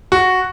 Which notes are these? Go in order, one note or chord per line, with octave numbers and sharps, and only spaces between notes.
F#4